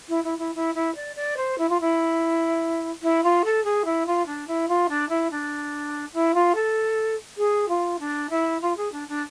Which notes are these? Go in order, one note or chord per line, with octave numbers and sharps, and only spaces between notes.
E4
E4
E4
E4
E4
D5
D5
C5
E4
F4
E4
E4
F4
A4
G#4
E4
F4
D4
E4
F4
D4
E4
D4
E4
F4
A4
G#4
F4
D4
E4
F4
G#4
D4
D4